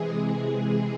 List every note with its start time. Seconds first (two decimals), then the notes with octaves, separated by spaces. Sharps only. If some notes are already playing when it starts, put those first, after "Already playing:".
Already playing: C3 E3 G#3 G#4
0.22 G#4